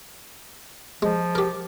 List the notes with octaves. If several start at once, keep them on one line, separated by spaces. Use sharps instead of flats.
F3 G#3
G4 A#4